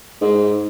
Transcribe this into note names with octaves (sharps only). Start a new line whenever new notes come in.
G#2